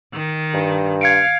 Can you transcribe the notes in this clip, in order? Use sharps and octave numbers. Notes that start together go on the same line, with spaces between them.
D#3
G2
F5 G#6 C#7 D7